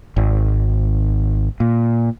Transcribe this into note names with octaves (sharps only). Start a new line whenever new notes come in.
G#1
A#2